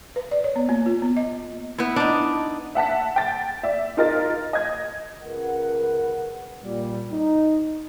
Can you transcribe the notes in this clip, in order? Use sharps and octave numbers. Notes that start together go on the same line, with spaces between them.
B4
D5
C#5
B3
A#3
F4
B3
D#5
B3 E4
D4 D#4
E5 F#5 A5 B6
G5 A6
D5 E5
D#4 F4 A#4 D#5 A6
D#5 G#6
C#2 A#4 B4 F#5
A#2 G3
D#4